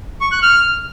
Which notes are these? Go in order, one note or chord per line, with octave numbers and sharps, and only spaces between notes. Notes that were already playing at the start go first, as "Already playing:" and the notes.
C#6
F#6
F6